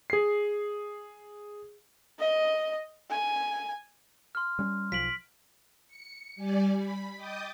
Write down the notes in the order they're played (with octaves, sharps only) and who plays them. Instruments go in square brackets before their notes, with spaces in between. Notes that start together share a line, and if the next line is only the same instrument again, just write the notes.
[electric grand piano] G#4 C7
[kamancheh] D#5
G#5
[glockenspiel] C6 F6
[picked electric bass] G3 C#4
[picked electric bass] B1 F3 [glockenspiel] B6 D7 F#7
[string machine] C#7
G3 D5 G#5
B5
D#5 G5 D6 D#6 G6 A6